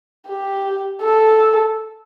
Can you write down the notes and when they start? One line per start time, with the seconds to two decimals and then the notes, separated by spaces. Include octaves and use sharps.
0.28 G4
1.03 A4